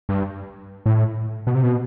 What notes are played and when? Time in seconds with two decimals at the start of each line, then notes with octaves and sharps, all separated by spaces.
0.09 G2
0.86 A2
1.47 B2
1.55 C3
1.63 B2